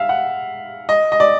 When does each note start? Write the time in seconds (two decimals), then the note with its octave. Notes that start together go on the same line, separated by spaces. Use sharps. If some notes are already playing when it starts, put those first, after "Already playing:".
Already playing: E5 F5
0.09 F#5
0.89 D#5
1.12 D#5
1.20 D5